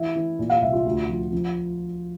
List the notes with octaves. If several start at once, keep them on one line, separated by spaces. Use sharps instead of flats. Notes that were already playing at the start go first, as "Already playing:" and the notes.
Already playing: E3 E4
E3
A#2
F5
C2 E5
F4
D2
F3
F3